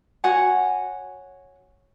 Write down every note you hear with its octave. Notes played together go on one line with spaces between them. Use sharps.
F#4 C#5 F#5 G#5